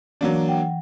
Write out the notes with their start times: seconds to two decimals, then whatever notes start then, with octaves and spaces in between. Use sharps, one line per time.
0.21 E3 F#3 A#3 D4
0.48 F#5 G5